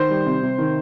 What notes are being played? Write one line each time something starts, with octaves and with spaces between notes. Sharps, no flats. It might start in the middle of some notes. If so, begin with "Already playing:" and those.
Already playing: D#3 C5
G3
C3
C3
D#3